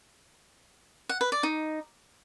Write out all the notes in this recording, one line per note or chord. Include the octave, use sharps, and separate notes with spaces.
F#5
B4
D5
D#4